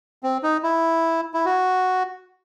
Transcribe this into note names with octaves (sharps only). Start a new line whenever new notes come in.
C4
D#4
E4
E4
F#4